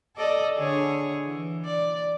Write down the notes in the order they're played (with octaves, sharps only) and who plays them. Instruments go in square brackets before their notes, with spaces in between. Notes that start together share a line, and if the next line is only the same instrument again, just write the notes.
[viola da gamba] A4 D5 D#5
D3 G#4 C#5
E3
D5